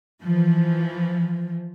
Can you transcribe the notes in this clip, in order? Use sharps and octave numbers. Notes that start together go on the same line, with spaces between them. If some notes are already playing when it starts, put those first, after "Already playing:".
E3 F3